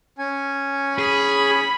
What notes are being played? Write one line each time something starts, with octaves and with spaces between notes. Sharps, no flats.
C#4 G#5
G#4 B5